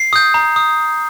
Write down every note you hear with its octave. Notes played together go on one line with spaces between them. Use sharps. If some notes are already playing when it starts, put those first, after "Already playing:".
Already playing: C7
D#6 G6
A#5
D#6